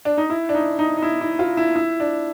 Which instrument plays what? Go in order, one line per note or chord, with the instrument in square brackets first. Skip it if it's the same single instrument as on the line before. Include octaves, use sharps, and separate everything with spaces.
[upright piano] D4
D#4
E4
D4
D#4
D#4
D#4
E4
E4
F4
E4
E4
D4